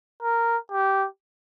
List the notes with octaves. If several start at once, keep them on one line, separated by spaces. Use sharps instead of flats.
A#4
G4